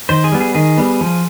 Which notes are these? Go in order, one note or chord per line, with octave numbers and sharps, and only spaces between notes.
D#3 C5
G#4
G3 B3
G#4
D#3 G#4
G3 B3
F3